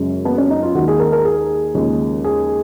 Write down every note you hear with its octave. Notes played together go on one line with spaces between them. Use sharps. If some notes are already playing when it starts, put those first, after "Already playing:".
Already playing: F#2 C#3 G#3
B3
C#4
D#4
F4
D#2 D#3 G#3 F#4
G#4
A#4
A#4
G#4
D#2 C#3 F3 G#3
G#4